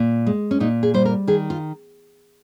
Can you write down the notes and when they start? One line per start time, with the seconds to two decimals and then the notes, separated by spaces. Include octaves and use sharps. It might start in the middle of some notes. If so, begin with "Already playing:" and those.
Already playing: A#2
0.27 G#3
0.51 C#4
0.60 A#2 D#4
0.83 G#4
0.94 G3 C5
1.05 A#4
1.27 D#3 G#4
1.50 F4